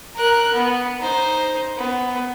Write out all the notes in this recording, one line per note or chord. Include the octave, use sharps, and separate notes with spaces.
A#4 F#6
B3
D#4 C5
B3